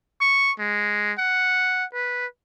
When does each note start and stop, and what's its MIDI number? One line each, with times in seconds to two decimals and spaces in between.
0.21 0.51 85
0.59 1.13 56
1.18 1.85 78
1.94 2.26 71